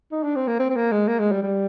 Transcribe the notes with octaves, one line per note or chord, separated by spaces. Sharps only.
D#4
D4
C4
A#3
C4
C4
A#3
G#3
A#3
G#3
G3
G3